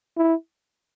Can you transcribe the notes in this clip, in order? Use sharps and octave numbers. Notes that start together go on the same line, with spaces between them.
E4